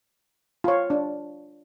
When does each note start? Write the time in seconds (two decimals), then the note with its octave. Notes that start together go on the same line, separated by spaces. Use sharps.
0.64 F4 C#5
0.90 D4